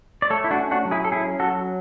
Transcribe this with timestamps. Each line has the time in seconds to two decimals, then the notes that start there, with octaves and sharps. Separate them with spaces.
0.22 D5
0.30 A3 A4 C#5
0.44 E4
0.51 D4 F#4
0.57 C#4
0.71 D4 F#4
0.85 F#3
0.91 E4 G#4
1.04 A4
1.12 C#4 E4 G#4
1.40 F#3 F#4 A4